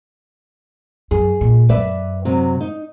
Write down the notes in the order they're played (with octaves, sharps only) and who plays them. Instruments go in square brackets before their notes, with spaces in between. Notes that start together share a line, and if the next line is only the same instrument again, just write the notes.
[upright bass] F#2 [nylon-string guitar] G#4
[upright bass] A#2
[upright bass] F#2 [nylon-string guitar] B4 D5 E5
[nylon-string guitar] C3 F#3
D#4